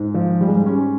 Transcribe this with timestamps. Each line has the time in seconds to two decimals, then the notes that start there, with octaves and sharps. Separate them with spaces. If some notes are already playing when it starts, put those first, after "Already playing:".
Already playing: G#2
0.14 F3
0.41 G3
0.48 G#3
0.57 G3
0.66 C#4